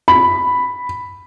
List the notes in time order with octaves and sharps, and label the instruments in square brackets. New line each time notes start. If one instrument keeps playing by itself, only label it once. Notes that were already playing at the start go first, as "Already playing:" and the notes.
[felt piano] B5